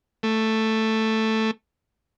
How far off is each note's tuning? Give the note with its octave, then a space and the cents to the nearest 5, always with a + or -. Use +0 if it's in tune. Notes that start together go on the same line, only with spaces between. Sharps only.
A3 +5